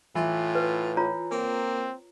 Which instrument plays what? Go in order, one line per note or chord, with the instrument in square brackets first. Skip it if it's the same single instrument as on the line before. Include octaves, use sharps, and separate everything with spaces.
[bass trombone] A2 [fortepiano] E3 [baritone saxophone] F4
[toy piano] B4
F4 C#5 A#5
[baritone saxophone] A#3 [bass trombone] C4